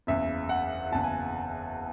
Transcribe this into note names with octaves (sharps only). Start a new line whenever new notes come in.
F#1 E2 C#3 E5
F#5
F#1 E2 C#3 A5
G#5